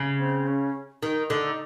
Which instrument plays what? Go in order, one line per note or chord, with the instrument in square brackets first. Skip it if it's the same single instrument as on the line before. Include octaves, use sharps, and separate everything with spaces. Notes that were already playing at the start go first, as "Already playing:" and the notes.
Already playing: [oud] C#3
[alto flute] C4
C#4
[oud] D#3 [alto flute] D#4
[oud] D3